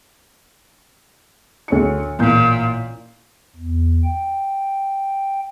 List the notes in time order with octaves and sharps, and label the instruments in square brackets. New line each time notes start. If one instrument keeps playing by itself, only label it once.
[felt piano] D2 C#5 C#7
[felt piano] A1 A#3 G6 [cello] A#2
[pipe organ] E2
G5